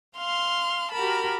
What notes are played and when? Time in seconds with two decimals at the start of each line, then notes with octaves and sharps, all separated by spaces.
0.17 F5 C6 F6
0.93 F#4 G4 A#4 A5 B5